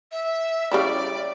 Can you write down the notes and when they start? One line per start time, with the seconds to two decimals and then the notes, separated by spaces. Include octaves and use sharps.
0.12 E5
0.71 C#3 G3 E4 D5